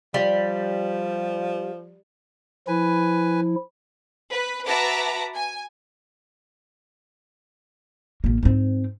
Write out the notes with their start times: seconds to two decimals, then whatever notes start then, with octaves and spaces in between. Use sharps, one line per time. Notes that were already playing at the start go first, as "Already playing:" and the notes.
0.14 F3 G3
2.68 F3 E4 B4 G#5
4.31 B4
4.66 F#4 B4 E5 A5 A#5 D6
5.35 G#5
8.24 A1 A#3
8.43 G#2 C4